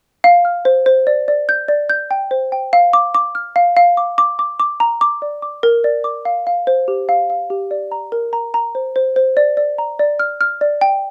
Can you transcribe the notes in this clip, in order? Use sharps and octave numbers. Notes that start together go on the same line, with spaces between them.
F5
F6
C5
C5
D5
D5
G6
D5
G6
G5
C5
G5
F5
D6
D6
F6
F5
F5
D6
D6
D6
D6
A#5
D6
D5
D6
A#4
D5
D6
F5
F5
C5
G4
F5
F5
G4
D5
A#5
A#4
A#5
A#5
C5
C5
C5
D5
D5
A#5
D5
F6
F6
D5
G5